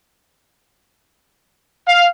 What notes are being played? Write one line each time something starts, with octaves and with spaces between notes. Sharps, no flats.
F5